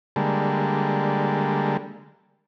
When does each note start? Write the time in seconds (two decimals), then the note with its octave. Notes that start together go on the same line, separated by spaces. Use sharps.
0.16 D3 G3 G#3 A#3 A4